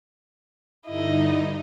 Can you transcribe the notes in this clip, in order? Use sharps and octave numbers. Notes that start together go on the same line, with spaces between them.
G2 D3 D#4 E4 D#5